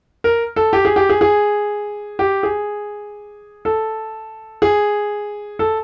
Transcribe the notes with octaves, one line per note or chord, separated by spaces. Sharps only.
A#4
A4
G4
G#4
G4
G#4
G#4
G4
G#4
A4
G#4
A4